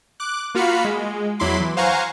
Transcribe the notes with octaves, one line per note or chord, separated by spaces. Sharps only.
D6 F#6
A#3 F4 F#4 F5 B5 C#7
G#3
E2 F#3 E4 B5 C6 D6
E3
C5 F5 F#5 G#5 A#5 C#6